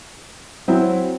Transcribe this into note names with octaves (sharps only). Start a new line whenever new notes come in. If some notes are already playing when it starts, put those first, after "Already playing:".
F#3 C4 E4